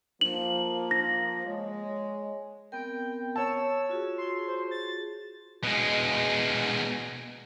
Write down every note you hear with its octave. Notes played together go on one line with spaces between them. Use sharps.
F3 A#3 F#7
A#6
G#3 C#5
B3 C4 A#4 G5
C#5 A5 E6
F4 F#4 G#4
C6
C5
A6
B2 G#3